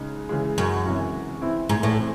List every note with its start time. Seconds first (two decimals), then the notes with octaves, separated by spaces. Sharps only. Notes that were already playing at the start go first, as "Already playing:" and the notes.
Already playing: C#3 G#3 D#4
0.29 C#3 E3 G#3
0.58 F#2
0.85 C3 E3 G#3 C#4 F#4
1.42 E3 C4 E4
1.69 G#2
1.83 A2
1.97 E3 C4